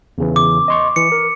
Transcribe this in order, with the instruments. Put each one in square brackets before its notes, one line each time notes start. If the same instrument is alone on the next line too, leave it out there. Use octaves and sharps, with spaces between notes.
[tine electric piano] E2 C#3 E3
[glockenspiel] D6
[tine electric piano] D#5 C6 C#6
[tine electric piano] E3 [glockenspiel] C#7
[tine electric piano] A#4